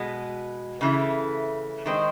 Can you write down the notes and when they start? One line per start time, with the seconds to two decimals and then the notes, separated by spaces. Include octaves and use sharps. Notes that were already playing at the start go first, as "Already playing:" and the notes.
Already playing: B2 G#3 B3
0.81 C#3 E3 A3
1.86 D#3 G#3 C4